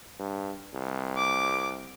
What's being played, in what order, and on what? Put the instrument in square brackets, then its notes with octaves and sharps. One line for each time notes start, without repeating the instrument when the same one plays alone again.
[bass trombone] G2
C2
[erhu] D6